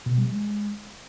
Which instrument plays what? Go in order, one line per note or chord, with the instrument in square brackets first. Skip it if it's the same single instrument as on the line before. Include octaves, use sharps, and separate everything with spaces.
[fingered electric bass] B2
G3
G#3